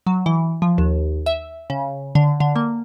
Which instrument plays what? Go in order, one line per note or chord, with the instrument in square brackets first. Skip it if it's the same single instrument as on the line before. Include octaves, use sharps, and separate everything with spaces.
[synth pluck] F#3
E3
F3
D#2
E5
C#3
D3
D3
A#3